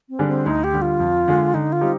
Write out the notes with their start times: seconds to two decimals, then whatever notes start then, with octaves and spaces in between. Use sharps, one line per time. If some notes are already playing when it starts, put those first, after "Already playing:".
0.09 C4
0.19 D3 G3 D4 G#4
0.27 C4
0.46 D2 D#4
0.64 G4
0.73 D3 G3
0.82 F4
1.00 F2
1.28 D3 G#3
1.54 D3 D#4
1.72 F4
1.81 G3 C4 D#4 G4